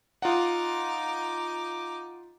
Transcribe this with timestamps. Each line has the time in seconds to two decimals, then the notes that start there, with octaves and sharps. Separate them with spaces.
0.22 D#4 F4 F#5 D6